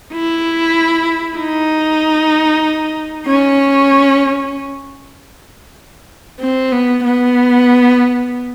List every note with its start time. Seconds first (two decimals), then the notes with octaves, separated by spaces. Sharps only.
0.13 E4
1.38 D#4
3.26 C#4
6.40 C4
6.72 B3
7.04 B3